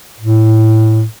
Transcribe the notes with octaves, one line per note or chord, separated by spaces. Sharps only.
A2